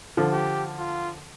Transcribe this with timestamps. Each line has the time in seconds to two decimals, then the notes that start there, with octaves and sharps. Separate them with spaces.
0.17 D3 F3
0.32 G4
0.78 F4